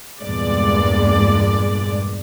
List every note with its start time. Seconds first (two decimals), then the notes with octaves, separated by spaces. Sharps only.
0.23 E2 G2 A#2 G#3 D5